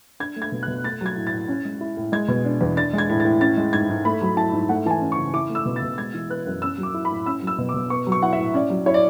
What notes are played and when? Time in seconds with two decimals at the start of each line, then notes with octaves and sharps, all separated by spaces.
0.20 D4 G#6
0.36 A3
0.42 G#6
0.52 B2
0.63 F#6
0.68 B2
0.84 A3 A6
1.01 F#3 G#6
1.16 A2
1.27 A6
1.33 A2
1.48 C#4
1.65 G#3
1.81 E4
1.97 A2
2.12 G#3 G#6
2.28 B2
2.45 D4
2.61 E2
2.76 D4 A6
2.93 G#3
2.98 G#6
3.09 A2
3.20 A6
3.25 A2
3.40 C#4 A6
3.57 G#3
3.73 G#2 G#6
3.89 G#2
4.05 A3 B5
4.22 F#3
4.37 E4 A5
4.53 G#2
4.69 A3 F#5
4.86 E3 A5
4.91 G#5
5.01 C#4
5.12 C#6
5.17 C#3
5.33 E4 D6
5.49 A3
5.55 E6
5.66 B2
5.76 A6
5.82 B2
5.98 G#3 G#6
6.14 E3
6.30 B3 F#6
6.46 F#2
6.62 C#4 E6
6.78 F#3
6.83 D6
6.94 E4
7.05 B5
7.10 A2
7.26 C#4 E6
7.42 F#3
7.47 E6
7.58 B2
7.69 D6
7.74 B2
7.90 B3 C#6
8.07 F#3
8.12 C#6
8.22 E4 F#5
8.33 E5
8.39 A2
8.54 C#4 D5
8.70 F#3
8.86 E4 C#5
8.94 D5